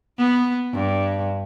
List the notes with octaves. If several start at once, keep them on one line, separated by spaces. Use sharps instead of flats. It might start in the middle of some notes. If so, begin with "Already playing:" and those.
B3
G2